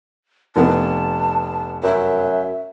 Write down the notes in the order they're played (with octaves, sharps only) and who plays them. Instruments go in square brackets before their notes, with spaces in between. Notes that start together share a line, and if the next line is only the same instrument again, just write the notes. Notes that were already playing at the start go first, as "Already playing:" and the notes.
[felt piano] F1 B3 [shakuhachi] A5
[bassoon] F#2 [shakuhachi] E5